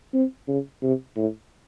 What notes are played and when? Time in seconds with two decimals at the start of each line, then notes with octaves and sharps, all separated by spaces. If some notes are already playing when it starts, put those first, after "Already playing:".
0.14 C4
0.48 C#3
0.83 C3
1.16 A2